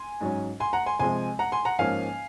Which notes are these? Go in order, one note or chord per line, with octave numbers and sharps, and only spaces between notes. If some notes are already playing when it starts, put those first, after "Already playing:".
Already playing: G#5 C6
G#2 F#3 C#4
G#5 C6
F#5 A#5
G#5 C6
C3 F3 G#3 G#5 C6
F#5 A#5
G#5 C6
F#5 A#5
G#2 F3 A#3 C#4 F5 G#5